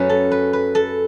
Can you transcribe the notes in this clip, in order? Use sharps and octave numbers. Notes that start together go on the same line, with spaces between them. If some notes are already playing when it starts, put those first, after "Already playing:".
Already playing: F#2 F#3 A3 C#4 B4
A4
B4
B4
A4